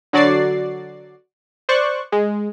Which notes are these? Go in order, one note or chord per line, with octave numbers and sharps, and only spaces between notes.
D3 F#3 F#4 D5 A6 C7
C5 D5 C#6 F#6
G#3